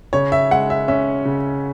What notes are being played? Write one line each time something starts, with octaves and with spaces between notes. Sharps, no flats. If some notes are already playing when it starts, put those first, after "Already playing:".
C#3 C#5
E5
G#3 F#5
E5
C#4 E5
C#3